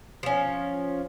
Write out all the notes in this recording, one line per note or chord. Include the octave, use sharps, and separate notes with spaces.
F3 C#4